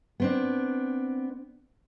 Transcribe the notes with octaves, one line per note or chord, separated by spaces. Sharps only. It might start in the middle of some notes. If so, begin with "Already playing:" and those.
B3 C4 D4